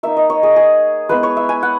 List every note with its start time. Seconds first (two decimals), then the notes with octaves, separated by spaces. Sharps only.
0.03 A#3 D#4 E5
0.17 D#5
0.30 C#5
0.43 G#4
0.56 G#4
1.09 G#3 B3 E4 B4
1.23 C#5
1.37 E5
1.49 G#5
1.63 F#5